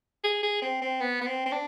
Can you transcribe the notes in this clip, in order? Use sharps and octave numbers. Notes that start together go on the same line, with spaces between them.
G#4
G#4
C4
C4
B3
B3
C4
C4
D4